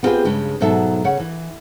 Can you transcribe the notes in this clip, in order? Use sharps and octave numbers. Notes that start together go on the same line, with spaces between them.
B3 C4 F4 G4 G#4 B4
G2 C#3 G#3
G#2 B2 F#3 A4 E5
C#3 C#5 F#5
E3